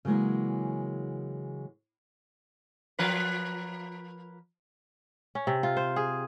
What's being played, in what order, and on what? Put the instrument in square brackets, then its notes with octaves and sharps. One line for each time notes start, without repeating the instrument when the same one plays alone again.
[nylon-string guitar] C#3 E3 F#3 G#3 A#3
[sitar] F3 A#4 B4
[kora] C#4
C3
F4
C5
G#4